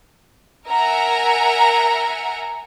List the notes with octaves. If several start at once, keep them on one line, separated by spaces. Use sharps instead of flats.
A#4 E5 F#5 G#5 A#5